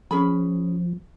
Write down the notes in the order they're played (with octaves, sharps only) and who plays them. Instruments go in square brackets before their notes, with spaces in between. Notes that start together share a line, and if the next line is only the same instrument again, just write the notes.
[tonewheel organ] F3 [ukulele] C#4 G#4 B5